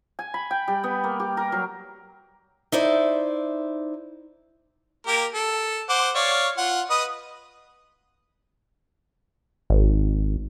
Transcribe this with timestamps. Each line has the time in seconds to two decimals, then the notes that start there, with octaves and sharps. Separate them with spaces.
0.19 G#5
0.34 B5
0.51 G5
0.68 G3
0.84 B3
1.04 A#3
1.20 G4
1.37 A#4
1.52 F#3
2.72 D#4 E4 C5 D5
5.07 A#3 G4 A#4
5.35 A4
5.89 C5 F#5 D6
6.15 C#5 D5 F5
6.58 F4 F#5
6.90 B4 D#5 D#6
9.70 G#1